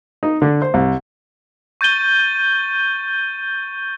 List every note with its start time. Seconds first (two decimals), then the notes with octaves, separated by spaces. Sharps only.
0.23 D#4
0.42 D3
0.62 C5
0.74 C2
1.81 C#6 G6 A6 D#7 G7